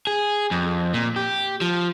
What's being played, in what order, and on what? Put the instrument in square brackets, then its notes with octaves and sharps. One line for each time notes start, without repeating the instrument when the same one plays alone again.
[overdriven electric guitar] G#4
F2
A#2
G4
F3